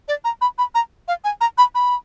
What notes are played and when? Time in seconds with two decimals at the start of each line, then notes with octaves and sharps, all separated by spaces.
0.08 D5
0.24 A#5
0.41 B5
0.58 B5
0.75 A#5
1.08 F5
1.24 G#5
1.41 A#5
1.58 B5
1.75 B5